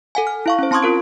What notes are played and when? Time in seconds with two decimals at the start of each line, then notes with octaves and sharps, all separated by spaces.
0.15 A4 F#5 G#5
0.27 F6
0.46 E4 F5 C#6
0.59 C#4 C5
0.71 C4 A5 C6 C#6 D#6 G#6
0.83 F4 A#4 D7